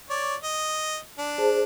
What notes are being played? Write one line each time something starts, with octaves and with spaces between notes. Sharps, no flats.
C#5 D5
D#5
D4
G#4 C5 A5